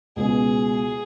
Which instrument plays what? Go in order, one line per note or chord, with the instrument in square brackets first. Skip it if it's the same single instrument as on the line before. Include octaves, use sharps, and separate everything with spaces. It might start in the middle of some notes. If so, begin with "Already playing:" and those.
[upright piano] C#2 B2 G#3 [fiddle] G#4